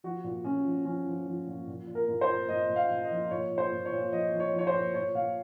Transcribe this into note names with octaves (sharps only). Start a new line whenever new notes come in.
F3 F#4
A#2
A#2 C#4
F3
F3 C#4
F3
F3
A#2
A#2
A#2
A#4
A#2
C5
A#2
A#2 D#5
A#2
F5
A#2
D#5
F3
A#2 C#5
A#2
C5
A#2
C#5
A#2
F3 D#5
F3
C#5
F3
C#5
C5
A#2
A#2 C#5
A#2 F5